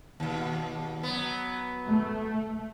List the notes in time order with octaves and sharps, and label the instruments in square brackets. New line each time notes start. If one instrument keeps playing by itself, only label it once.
[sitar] D#2 B2
F#3 B3
[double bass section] A3